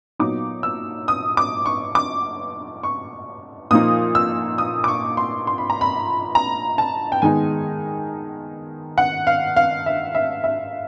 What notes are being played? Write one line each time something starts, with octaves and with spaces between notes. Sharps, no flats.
A#2 F#3 B3 D#4 D6
E6
D#6
D6
C#6
D6
C#6
A#2 F3 A#3 D#4 D#6
E6
D#6
D6
C#6
C6
C6
B5
A#5
B5
A#5
A5
G5
D#3 G#3 B3 D#4 G#5
F#5
F5
F5
E5
E5
E5